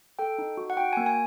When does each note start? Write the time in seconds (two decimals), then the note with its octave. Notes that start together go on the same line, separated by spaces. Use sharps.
0.19 A4 G5
0.38 D#4
0.57 F#4
0.70 F#5
0.77 F#4 G5
0.93 G#5
0.97 A#3
1.06 G#5